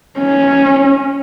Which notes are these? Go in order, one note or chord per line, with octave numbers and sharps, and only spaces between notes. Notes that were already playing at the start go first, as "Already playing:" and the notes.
C#4